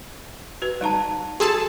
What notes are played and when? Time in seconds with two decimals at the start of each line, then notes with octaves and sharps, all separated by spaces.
0.62 F#4 B4
0.81 G3 D#4 D5 A5 A#5
1.40 F#4 G#4 A4 A5